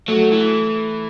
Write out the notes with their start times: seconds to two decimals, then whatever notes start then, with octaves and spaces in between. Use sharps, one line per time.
0.08 F#3 A3
0.32 E3